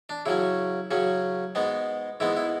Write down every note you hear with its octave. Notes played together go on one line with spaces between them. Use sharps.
D4
C#3 F#3 C#4 E4
C#3 F#3 C#4
G#2 G#3 B3
G#2 G#3 B3 E4
E4